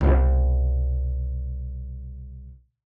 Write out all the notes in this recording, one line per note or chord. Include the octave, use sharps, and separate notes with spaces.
C2 B2